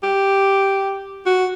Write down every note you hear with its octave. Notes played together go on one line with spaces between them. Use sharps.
G4
F#4